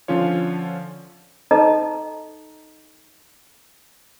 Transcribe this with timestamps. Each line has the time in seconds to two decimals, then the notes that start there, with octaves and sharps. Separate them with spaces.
0.08 D3 F3 C#4 F4 C#5
1.51 D#4 A4 D#5 A5 A#5